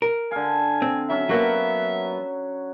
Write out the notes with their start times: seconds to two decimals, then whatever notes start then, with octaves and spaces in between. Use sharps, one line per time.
0.02 A#4
0.31 D3 F5 G#5
0.82 C4
1.10 F#3 C#4 E5
1.29 F#3 A#3 B3 F#5